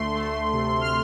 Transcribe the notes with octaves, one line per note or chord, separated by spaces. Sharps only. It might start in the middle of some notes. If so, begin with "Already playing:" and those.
Already playing: D2 A3 C6
A3
C3
F6